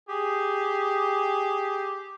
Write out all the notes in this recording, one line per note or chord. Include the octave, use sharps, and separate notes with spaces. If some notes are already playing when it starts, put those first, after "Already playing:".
G4 G#4